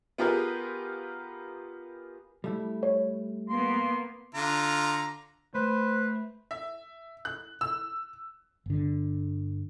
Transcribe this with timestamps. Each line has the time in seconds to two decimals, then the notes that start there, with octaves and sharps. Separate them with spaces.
0.18 B3 F4 G4 G#4 A#4 B4
2.44 G3 A3 E4
2.83 C#5
3.49 A#3 B3 C6
4.35 D3 F4 A#5
5.55 A3 B4 C5
6.51 E5
7.25 F#6
7.61 E6
8.66 G1 D3